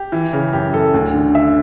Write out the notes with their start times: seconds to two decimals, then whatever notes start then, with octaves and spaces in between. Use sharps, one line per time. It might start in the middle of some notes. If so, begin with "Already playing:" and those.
Already playing: G4
0.12 E3
0.33 C#3
0.53 F#2 G4
0.73 F#2 A4
0.94 D2
1.14 D3
1.35 D3 E5